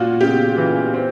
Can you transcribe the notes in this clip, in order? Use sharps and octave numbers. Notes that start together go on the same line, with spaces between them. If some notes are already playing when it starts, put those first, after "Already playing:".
Already playing: A#2 F4 F#4
C#3 G4
E3
C4